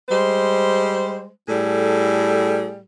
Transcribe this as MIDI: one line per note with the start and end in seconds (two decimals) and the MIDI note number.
0.09 1.28 55
0.09 1.28 56
0.09 1.28 72
1.48 2.79 45
1.48 2.79 55
1.48 2.79 68
1.48 2.79 69